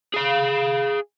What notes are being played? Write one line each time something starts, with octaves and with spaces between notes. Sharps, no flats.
G#4 F5